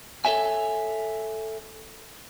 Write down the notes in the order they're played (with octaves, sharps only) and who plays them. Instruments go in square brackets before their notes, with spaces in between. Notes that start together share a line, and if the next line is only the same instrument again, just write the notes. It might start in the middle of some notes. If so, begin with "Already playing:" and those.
[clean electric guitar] A4 C5 C#5 E5 G#5